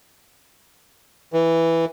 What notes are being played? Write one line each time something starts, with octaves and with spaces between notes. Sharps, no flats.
E3